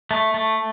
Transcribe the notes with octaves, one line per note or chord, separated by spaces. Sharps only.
A3
A3